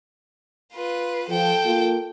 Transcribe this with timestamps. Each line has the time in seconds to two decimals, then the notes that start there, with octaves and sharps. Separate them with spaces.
0.73 F4 B4
1.28 F3 A4 G5
1.65 A#3 F4